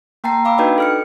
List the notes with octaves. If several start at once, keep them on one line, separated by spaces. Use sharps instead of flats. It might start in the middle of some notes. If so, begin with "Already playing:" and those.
A#3 G5 A5 A#5 C7
F5 B5 D6 E6
D4 D#4 F#4 B4 D#5 G5
A4 F6 C#7